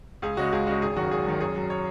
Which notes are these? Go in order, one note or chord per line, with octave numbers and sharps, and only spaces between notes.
C#2 G#4
C#3 G#3 F#4
C#2 G#4
C#3 G#3 F#4
G#1 G#4
F#2 D#3 F#4
G#1 G#4
F#2 D#3
F#2 G#4
F#3
C#5